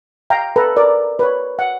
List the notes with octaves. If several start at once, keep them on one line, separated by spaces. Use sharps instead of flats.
F5 G5 A#5
A4 B4 A#5
A#4 D5
B4 C#5
F#5